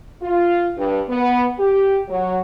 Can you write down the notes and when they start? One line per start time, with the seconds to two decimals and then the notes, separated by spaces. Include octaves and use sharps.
0.21 F4
0.76 G2
1.08 B3
1.58 G4
2.09 F#3